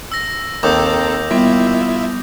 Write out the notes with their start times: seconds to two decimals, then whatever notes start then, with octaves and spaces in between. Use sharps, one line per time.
0.12 E6 A#6
0.63 D#2 C4 A4 A#5 D6 D#6 G6
1.31 G3 B3 E4 F4 E5